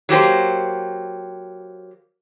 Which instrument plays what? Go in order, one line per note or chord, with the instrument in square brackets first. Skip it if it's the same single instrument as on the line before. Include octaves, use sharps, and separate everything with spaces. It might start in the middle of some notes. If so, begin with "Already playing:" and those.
[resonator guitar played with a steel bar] F#3 A#3 G4 C5